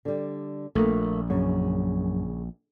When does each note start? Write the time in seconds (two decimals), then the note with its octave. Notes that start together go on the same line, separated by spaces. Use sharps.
0.05 D3 G3
0.75 A#1 A3 A#3
1.30 F#2 C#3